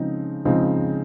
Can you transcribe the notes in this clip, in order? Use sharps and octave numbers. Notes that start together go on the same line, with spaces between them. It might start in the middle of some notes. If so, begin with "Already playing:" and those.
Already playing: C#3 F3 G#3 C4 D#4
C#3 F3 G#3 C4 D#4